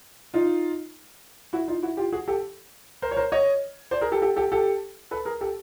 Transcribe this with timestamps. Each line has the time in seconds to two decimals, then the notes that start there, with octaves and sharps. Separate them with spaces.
0.34 D#4 F4
1.53 E4 F#4
1.68 D#4 F4
1.83 E4 F#4
1.97 F4 G4
2.12 F#4 G#4
2.28 G4 A4
3.02 A#4 C5
3.11 C#5
3.17 A#4 C5
3.32 C#5 D#5
3.91 C5 D5
4.01 G#4 A#4
4.12 G4 A4
4.22 G4 A4
4.36 G4 A4
4.52 G4 A4
5.11 A4 B4
5.25 G#4 A#4
5.41 G4 A4